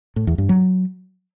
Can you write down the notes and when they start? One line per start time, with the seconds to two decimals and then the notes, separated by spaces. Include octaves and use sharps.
0.16 A2
0.27 E2
0.38 G2
0.49 F#3